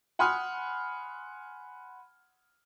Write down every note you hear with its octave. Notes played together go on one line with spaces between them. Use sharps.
F#5 G#5 B5 C6 D#6 F6